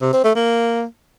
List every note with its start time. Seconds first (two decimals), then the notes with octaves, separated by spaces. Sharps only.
0.02 C3
0.13 C4
0.24 A3
0.35 A#3